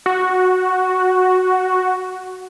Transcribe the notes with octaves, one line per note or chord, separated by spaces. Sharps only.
F#4